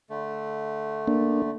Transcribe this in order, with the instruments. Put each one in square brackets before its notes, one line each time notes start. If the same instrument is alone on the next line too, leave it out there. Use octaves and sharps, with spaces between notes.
[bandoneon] D3 A3
[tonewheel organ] A#3 D4